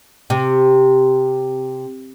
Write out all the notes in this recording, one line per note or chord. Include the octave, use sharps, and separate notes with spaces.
C3